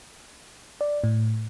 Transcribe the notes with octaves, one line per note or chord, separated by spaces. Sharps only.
D5
A2